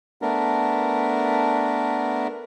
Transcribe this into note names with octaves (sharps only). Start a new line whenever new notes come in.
A3 B3 D4 A#4